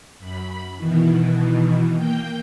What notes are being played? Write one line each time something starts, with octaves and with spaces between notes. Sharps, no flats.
F#2 B5
B2 D#3 E3
A#3 G5 G6